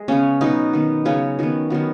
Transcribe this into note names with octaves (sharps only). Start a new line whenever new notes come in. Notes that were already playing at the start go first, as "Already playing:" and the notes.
Already playing: G#3
C#3 B3 C#4
B2 F#3 B3 D#4
D#3 B3
C#3 F#3 B3 C#4
D#3 F#3 B3
D#3 F#3 B3